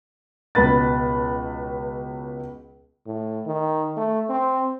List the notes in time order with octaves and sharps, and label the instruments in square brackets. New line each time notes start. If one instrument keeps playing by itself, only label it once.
[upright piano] C#2 B2 B4 A6
[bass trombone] A2
D#3
A3
C4